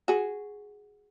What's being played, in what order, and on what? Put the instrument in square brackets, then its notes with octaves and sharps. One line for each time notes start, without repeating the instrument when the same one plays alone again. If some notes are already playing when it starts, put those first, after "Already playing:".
[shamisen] F#4 G#4